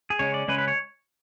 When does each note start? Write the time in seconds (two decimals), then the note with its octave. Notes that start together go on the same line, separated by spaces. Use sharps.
0.10 G#4
0.19 C#3 G#3 C#4 C#5
0.34 D5
0.48 C#3 G#3 C#4 B4
0.58 B4
0.68 C#5